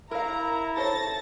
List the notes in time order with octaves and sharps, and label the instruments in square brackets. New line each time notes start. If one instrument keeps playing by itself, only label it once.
[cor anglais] E4 [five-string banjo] A#4 F5 [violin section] A#5
[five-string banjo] A4 C5 C#5 [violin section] A5 A6 A#6